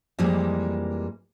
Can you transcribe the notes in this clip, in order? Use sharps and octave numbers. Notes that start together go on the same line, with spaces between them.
F2 E3 G3 G#3 A#3